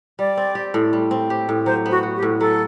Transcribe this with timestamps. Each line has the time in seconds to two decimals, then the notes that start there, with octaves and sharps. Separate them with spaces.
0.19 G3 D5
0.37 C4
0.55 G4
0.74 A2
0.93 G3
1.11 C4
1.30 G4
1.49 A2
1.66 F#3 C5
1.86 B3
1.91 F#4
2.03 F#4
2.16 G4
2.23 A2
2.40 F#3 A4